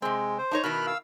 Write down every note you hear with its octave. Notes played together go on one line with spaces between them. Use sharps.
C3 G#3 C4
C5
D4 D#4 C#5
B2 D#3 E4 B5 F6 F#6
F5 E6